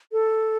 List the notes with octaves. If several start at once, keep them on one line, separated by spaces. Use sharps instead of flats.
A4